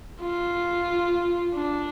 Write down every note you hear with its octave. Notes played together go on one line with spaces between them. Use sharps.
F4
D4